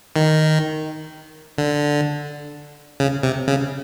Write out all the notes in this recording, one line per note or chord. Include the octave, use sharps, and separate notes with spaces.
D#3
D3
C#3
C3
C#3